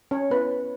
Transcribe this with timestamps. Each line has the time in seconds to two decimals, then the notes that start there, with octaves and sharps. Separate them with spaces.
0.11 C#4 C#5
0.30 B3 E4 B4